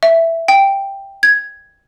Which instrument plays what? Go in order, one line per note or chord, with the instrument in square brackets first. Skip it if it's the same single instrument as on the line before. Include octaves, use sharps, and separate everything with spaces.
[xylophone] E5
G5
G#6